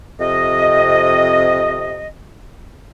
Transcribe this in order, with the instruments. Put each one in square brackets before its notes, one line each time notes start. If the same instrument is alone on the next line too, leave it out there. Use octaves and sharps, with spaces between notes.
[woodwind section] F2 C3 D#5